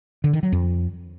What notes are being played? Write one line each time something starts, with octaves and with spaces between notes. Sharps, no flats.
D3
D#3
F#3
F2